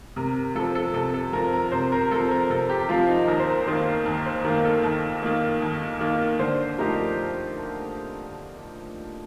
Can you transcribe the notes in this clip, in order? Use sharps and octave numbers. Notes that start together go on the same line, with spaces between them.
C3 A#4
F3 C4 A4
A4
C3 A4
A4
F3 C4 A#4
A#4
C3 C5
A#4
F3 C4 A4
A#4
C3 A4
G4
F3 C4 F4
D#4
D#2 A#4
C5
A#4
D#3 A#3 C5
D#2 A#4
C5
D#3 A#3 A#4
A4
D#2
D#3 A#3
D#2
D#3 A#3
D3 C5
F3 A3 D#4 G4 A#4